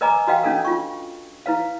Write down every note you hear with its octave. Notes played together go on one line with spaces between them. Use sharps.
A#4 B4 D#5 G#5 A#5 D6
F#4 B4 D#5 F5 G5
C#4 D4 A4 A#4
F4 C#6
E4 B4 F5